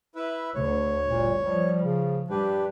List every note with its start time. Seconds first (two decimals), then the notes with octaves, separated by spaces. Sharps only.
0.15 E4 B4 E5
0.55 D2 C#5
1.07 G1 A#2
1.43 F3 G3
1.83 C#3
2.30 G2 D4 G4 B4